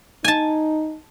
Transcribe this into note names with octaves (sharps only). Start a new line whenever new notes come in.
D#4 G#5 A5